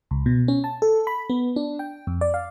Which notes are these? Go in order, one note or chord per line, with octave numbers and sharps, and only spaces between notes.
C#2
B2
C#4
A5
A4
B5
B3
D4
G5
F2
D5
F5